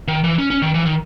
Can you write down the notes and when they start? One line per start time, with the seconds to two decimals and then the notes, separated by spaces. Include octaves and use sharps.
0.08 D#3
0.24 E3
0.39 C#4
0.50 C#4
0.62 D#3
0.74 E3
0.86 D#3